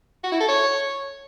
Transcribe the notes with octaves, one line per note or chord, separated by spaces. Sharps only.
F#4
E4
A4
C#5